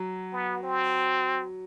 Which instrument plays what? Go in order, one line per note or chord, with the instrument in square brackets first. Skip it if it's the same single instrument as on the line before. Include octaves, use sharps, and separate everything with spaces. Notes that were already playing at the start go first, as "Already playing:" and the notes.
Already playing: [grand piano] F#3
[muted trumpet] B3
C4